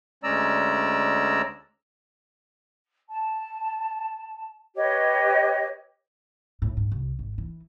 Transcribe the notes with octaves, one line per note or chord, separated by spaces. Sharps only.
D2 G#3 C#4 D5 A#5 E6
A5
G4 B4 C#5 D#5
A2
G#2
C2
G#1
E3